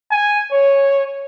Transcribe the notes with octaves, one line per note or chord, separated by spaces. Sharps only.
G#5
C#5